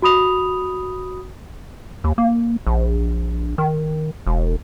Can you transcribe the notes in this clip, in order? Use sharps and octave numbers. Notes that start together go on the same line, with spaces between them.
F#4 B5 D#6 F7
D#2
A#3
A#1
D#3
E1